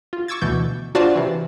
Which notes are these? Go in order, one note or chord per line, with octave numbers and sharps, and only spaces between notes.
F4
C#6 D6 E6 G#6 A6
D2 B2 E3 G6
D4 F4 F#4 C5 D5 A5
C3 E3